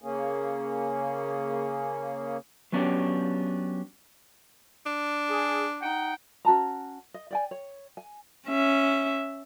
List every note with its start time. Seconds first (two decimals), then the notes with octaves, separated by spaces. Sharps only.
0.02 C#3 A#3 C#4 G#4
2.72 F#3 B3 C#4 D4 F4 G4
4.86 D4
5.30 G#4
5.81 D#4 F#5 G5
6.45 C#4 F#4 A5 A#5
7.14 D#5
7.31 D5 G5 G#5
7.51 C#5
7.97 G#5
8.48 C#4 E5